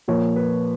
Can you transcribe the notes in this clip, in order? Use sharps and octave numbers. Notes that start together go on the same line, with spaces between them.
A#2 F3 A#3 C#5
B4